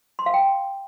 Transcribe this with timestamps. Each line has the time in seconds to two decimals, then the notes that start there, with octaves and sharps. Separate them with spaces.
0.19 C6
0.26 F5
0.34 G5